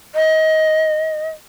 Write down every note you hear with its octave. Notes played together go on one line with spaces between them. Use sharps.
D#5